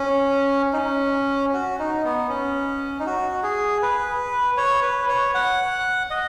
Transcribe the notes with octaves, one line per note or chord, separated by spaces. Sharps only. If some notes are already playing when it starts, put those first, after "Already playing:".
Already playing: C#4
D#4
C#4
F#4
D#4
B3
C#4
D#4
F#4
G#4
B4
C#5
B4
C#5
F#5
D#5